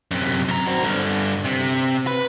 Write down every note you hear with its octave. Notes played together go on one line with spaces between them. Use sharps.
F#2 C3
F#2 A#5
C4 F#4
G2 D3
C3
B4